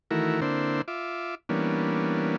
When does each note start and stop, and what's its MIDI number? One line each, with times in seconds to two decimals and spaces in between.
0.11 0.40 51
0.11 0.40 52
0.11 0.40 57
0.11 0.40 64
0.11 0.40 66
0.11 0.40 70
0.42 0.82 50
0.42 0.82 58
0.42 0.82 60
0.42 0.82 62
0.42 0.82 64
0.42 0.82 72
0.88 1.35 65
0.88 1.35 76
0.88 1.35 86
1.49 2.36 52
1.49 2.36 55
1.49 2.36 58
1.49 2.36 59
1.49 2.36 61
1.49 2.36 62